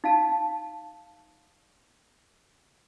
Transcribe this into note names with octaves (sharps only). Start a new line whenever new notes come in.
D#4 F5 A5